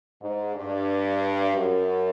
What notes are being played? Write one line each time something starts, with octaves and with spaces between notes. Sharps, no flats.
G#2
G2
F#2